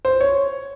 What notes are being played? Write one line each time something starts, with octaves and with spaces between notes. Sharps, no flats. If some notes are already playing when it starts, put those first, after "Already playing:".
C5
C#5